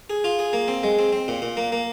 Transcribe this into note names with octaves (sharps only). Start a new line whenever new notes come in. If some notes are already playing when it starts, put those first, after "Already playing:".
G#4
F4
G#4
A#3
C4
G#3
C4
C4
A#2
A#2
A#3
A#3